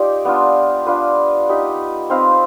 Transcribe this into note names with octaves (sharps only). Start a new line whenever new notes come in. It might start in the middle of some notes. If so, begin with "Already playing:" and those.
Already playing: D#4 F4 G4 D5
B3 D4 F4
D4 F4 B4
D#4 G4 B4
C4 D#4 B4 F5